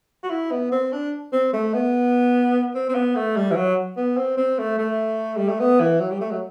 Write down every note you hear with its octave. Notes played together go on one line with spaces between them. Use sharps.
F#4
E4
B3
C4
D4
C4
A3
B3
C4
C4
B3
A3
G3
E3
F#3
B3
C4
C4
A3
A3
G3
A3
B3
E3
F#3
G3
A3
F#3